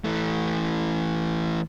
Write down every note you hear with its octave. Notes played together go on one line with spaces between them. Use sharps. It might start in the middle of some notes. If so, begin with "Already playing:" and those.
E3 A3